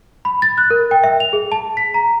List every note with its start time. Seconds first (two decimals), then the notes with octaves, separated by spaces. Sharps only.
0.25 B5
0.42 A6
0.58 F#6
0.70 A#4
0.91 G5
1.04 E5
1.20 F7
1.33 G#4
1.52 A5
1.77 B6
1.94 A#5